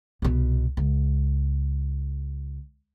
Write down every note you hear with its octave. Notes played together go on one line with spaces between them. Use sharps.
C2 B2
C#2